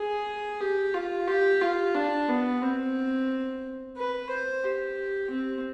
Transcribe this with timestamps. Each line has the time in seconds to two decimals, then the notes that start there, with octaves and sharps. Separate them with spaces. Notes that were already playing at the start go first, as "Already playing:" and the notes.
Already playing: G#4
0.61 G4
0.94 F4
1.28 G4
1.62 F4
1.95 D4
2.29 B3
2.62 C4
3.97 B4
4.30 C5
4.64 G4
5.31 C4